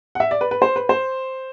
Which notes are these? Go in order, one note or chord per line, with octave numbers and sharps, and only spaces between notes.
F#5
E5
D5
B4
B4
C5
B4
C5